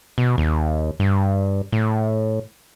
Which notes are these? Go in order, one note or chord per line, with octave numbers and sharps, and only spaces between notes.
B2
D#2
G2
A2